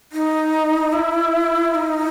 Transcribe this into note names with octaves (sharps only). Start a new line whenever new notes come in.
D#4
E4
D#4